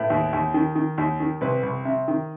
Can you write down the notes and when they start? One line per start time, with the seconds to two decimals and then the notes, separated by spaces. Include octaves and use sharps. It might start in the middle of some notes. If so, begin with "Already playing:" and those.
Already playing: A2 B4
0.10 D#2
0.33 D#2
0.54 D#3
0.75 D#3
0.98 D#2
1.20 D#3
1.41 C2 B4
1.63 C2
1.85 C3
2.08 D#3